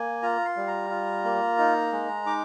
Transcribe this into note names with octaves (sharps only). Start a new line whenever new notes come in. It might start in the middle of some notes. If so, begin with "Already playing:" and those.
Already playing: A#3 G#5
F4 A#5
C6
G3
A#5
F4
A#3
D#4
G#3
D#4 D6